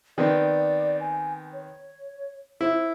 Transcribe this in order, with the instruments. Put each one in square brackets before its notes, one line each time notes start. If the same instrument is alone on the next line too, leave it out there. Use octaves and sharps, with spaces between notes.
[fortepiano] D#3 B3 C4 [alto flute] D5
[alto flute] G#5
C#5
[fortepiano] E4 [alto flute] C5